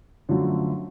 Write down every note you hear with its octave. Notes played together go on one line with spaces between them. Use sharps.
F#2 D3 F3 A3